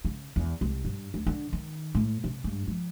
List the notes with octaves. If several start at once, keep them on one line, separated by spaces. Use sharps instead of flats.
C#3
E2
C2
G2
D2
D3
D#3
A2
C3
G2
F3